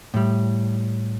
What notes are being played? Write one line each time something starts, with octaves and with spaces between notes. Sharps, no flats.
A2 G3